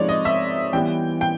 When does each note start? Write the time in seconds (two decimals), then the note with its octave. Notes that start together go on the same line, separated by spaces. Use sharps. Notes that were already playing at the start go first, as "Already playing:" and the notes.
Already playing: C3 F3 G#3 C4 D#4 C#5 D5
0.09 D#5
0.25 E5
0.73 E3 G3 B3 G5
1.21 G5